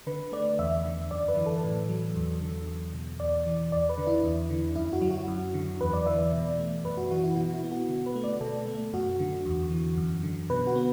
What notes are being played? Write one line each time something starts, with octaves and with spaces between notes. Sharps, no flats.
D3 B4
A3 D5
E2 E5
D3
F#2 D5
B4
E3
A4
A2
F#3
E2
D3
E2
B2
E2 D5
E3
E2 D5
B4
D3
E4
E2
D3
F#2 E4
F#4
F#3
F#4
F#2
D3
E2 B4
D5
E3 E5
D5
B2
A3
F#2 B4
F#4
E3 F#4
E4
B2 F#4
E4
B3
F#4
D3
B4
A3
D5
B2 A4
A3
F#2 F#4
D3
E2
E3
F#2
D3
B2 B4
F#4
B3